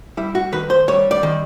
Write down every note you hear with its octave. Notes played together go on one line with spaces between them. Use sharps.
G3 E4
F#4
D#3 B4
C5
G3 C#5
D5
D#3